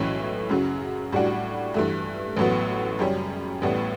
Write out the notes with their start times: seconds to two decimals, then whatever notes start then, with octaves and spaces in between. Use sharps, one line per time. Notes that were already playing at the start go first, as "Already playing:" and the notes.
Already playing: B1 A2 E3 A3 C#4
0.49 F#2 C#3 F#3
1.12 A2 G3 D4 F#4
1.74 G2 E3 A3
2.37 A1 A2 F#3 B3
2.99 F#2 C#3 G3 C#4
3.62 A1 A2 G3 B3